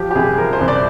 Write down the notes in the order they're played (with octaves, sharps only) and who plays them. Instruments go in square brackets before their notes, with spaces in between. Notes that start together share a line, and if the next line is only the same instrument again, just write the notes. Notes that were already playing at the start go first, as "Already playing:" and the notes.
Already playing: [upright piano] F3 G4
G4
C2 G#4
F3 A#4
C5
C2
D5